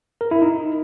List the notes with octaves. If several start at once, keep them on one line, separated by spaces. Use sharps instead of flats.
A#4
E4
D#4